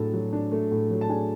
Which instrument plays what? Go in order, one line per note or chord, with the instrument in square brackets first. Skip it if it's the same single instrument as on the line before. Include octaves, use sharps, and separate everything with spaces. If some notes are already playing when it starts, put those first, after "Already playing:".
Already playing: [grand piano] A2 F#3 A3 D4 G#4 A4 A5
F#3
D4
A3
A2
F#3
A5
D4 G#4 G#5